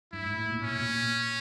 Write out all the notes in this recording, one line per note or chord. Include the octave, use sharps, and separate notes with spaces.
G2 E4
G#2
A2
A#2
A#2 C#4
B2
A#2